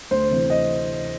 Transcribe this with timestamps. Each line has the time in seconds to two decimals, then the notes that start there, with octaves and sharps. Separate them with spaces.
0.11 D2 C5
0.30 C3 E3
0.50 D#5